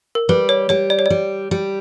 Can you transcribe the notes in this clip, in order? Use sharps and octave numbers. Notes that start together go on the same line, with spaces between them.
A#4
G3 B4
C#5
G3 C#5
D5
C#5
G3 D5
G3